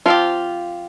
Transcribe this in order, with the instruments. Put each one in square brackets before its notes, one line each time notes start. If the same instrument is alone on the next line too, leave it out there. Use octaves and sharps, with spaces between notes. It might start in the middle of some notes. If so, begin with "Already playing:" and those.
[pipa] F3 C4 G4 [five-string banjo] F4